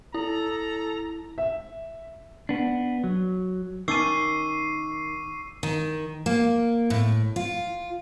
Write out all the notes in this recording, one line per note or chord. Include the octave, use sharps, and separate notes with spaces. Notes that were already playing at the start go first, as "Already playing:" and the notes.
E4 A4 A#5
E5
B3 D4
F#3
D#3 C#4 A5 C#6 D6 E6 C7 D#7
D#3
A#3
A2
F4